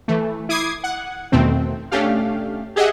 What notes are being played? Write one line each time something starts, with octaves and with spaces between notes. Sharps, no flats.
E3 A3
E4 D6 D#6 G#6 C7
F#5
E2 B2 D#3 A3 C4
A3 C#4 D4 G4 F5
G4 G#4 D#5 E5 F#5